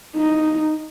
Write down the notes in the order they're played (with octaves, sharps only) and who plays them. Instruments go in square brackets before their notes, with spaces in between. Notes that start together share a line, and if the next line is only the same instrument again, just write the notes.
[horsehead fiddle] D#4